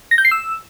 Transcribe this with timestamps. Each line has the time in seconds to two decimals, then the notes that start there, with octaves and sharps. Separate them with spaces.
0.11 A#6
0.18 G6
0.25 C7
0.31 E6